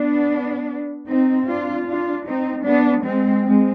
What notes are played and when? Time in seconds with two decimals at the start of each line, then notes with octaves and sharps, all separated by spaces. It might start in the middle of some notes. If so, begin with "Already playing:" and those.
Already playing: B3 D4
1.07 C4 D#4
1.47 D4 F4
1.86 D4 F4
2.25 C4 D#4
2.65 B3 D4
3.04 G#3 C4
3.43 G#3 C4